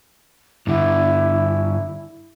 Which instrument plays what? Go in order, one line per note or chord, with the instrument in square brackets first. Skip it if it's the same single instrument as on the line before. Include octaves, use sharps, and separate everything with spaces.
[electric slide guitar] G2 D3 [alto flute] E4